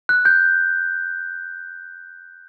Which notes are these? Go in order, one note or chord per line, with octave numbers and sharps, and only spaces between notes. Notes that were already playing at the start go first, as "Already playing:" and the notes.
F#6
G6